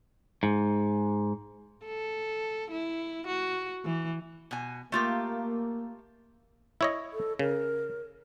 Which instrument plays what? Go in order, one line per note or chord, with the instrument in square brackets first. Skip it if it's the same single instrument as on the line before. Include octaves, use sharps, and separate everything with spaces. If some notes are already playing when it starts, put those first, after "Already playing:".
[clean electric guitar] G#2
[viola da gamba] A4
E4
F#4
E3
[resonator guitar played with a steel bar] B2 G#5
[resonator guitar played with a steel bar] A3 F4 G4 [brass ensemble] A#3
[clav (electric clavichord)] E4 C#5 D#5
[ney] A4
[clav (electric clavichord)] C#3 [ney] A#4